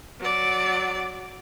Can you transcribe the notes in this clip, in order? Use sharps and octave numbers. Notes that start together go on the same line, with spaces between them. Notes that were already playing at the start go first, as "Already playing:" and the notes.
F#3 D5